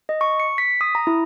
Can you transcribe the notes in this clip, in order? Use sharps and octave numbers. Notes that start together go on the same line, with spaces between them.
D#5
C#6
C#7
B6
D#6
A#5
E4